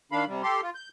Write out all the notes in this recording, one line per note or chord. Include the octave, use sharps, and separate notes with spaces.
D#3 D4 F5 B5
C3 G3
G4 A4 C6
F4
G6